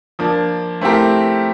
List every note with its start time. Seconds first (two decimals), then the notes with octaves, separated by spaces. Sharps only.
0.19 F3 A#3 D4
0.81 A3 C4 E4 G4 A#4